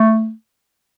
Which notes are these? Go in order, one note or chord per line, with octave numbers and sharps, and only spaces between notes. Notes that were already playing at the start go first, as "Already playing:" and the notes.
Already playing: A3